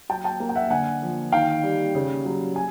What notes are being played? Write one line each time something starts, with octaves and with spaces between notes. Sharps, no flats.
F#3 G5 A5
G5 A5
A#3
G5
E5 F#5
D3 F#5 G#5
F3
D#3 F5 G5
G3
C#3
F#3
G#5